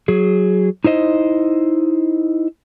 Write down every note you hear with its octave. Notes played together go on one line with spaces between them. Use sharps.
F#3 G#4
D#4 E4 C5 D#5